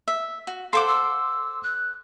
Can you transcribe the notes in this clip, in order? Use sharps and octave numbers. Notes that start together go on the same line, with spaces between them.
E5
F#4
A4 C5 F5 F#5 C6 D6
E6
F#6